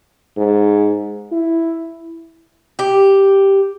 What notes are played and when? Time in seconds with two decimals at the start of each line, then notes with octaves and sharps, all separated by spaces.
0.37 G#2
1.32 E4
2.79 G4